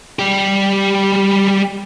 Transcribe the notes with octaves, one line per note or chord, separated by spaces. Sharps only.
G3 G4